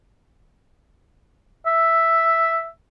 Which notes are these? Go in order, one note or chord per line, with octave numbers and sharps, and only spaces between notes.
E5